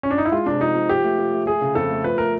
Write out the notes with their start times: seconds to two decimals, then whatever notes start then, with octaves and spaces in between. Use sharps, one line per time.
0.03 C#4
0.11 D4
0.18 D#4
0.25 E4
0.32 G#3 F4
0.46 C3 D4
0.61 F3 D#4
0.75 F3
0.89 F3 G4
1.04 A3
1.19 F3
1.33 A3
1.47 A3 G#4
1.61 C#3
1.75 F2 A4
1.90 A3
2.04 F3 B4
2.18 A3 A#4